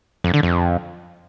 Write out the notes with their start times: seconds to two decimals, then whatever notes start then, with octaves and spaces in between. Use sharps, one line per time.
0.24 F2
0.34 D3
0.43 F2